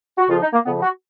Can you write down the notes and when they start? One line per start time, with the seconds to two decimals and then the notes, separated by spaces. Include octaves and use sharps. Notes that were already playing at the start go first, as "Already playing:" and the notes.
0.18 F#4
0.29 F2 C#3 F3 F4
0.41 D#4
0.53 A#3
0.65 F2 C#3 F3 B3
0.82 F#4